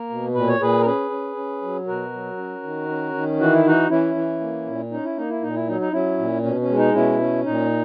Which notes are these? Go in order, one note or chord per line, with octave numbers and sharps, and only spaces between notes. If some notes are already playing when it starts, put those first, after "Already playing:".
Already playing: A#3 A#4
B2
A#2 B4
C#5
A#2 G#4 B4
A#4
C#4 G#4 B4
C#4
C#4
F#3
B2 F#4 A#4
F#3
C#4
D#3
C#4
D#3
E3 F#4
E4
E3 D#4 F#4
E3 C#4 E4
E3
A#3
A#2
C#4 D#4
E4
A#3 D#4
E4
A#2 D#4
E4
F#3 D#4
D#4
F#3 C#4 E4
A#2
B2 C#4
C#4
G#3
D#4
B2 C#4 E4
C#4
A#2 D#4